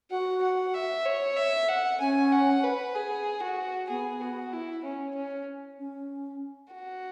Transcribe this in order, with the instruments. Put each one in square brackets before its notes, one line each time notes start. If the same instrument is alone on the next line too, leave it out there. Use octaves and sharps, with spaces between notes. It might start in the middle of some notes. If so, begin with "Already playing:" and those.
[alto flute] F#4 [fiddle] F#5
[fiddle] F#5
E5
C#5
E5
F#5
[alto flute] C#4 [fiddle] G#5
[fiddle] F#5
B4
G#4
F#4
[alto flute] B3 [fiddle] G#4
[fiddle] F#4
E4
C#4
C#4
[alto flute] C#4
[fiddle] F#4